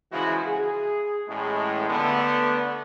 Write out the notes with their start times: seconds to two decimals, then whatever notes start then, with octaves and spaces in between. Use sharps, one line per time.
0.12 C#3 E3 F3 G#3 E4 F#4
0.46 G#4
1.28 A1 A2 G#3
1.90 D3 A3 B3